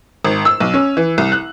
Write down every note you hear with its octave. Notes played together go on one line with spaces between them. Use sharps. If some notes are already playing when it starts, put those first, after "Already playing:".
G#1
E6
B1
C#4
E3
C2
F#6